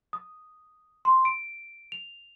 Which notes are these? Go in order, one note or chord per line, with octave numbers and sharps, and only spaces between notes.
D#6
C6
D7
F7